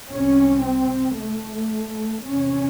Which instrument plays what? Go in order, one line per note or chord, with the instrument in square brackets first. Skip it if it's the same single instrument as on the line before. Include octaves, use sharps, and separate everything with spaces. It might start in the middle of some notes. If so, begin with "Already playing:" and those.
[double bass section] C2 C3 C#4
C4
A3
E2 C3 C#4